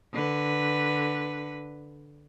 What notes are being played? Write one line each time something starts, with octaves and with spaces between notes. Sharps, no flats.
D3 B4